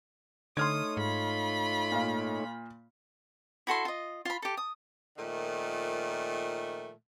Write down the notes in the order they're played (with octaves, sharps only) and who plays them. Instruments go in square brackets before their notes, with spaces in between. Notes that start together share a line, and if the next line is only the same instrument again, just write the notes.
[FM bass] D3 [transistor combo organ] A3 D#4 C#5 [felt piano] C6 F6 G#6 [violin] D#6
[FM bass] G#2 [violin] F4 B5
[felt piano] A#2 F5
[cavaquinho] E4 F#4 A4 C6
F4 D#5
F4 B5
G4 A4
D#6
[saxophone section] A#2 D#3 F3 A3